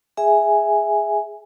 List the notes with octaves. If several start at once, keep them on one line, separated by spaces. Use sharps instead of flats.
G#4 E5 G#5